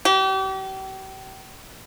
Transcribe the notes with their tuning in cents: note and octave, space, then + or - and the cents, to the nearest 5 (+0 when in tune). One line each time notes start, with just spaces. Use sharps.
G4 -40